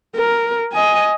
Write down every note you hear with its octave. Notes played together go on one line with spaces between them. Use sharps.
A#4
D#5 G#5